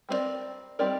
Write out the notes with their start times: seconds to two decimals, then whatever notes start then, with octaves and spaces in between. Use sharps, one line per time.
0.09 G3 C4 D#4 A#4 D5
0.79 G3 C4 D#4 A#4 D5